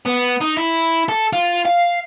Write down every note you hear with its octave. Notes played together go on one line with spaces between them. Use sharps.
B3
D#4
E4
A4
F4
F5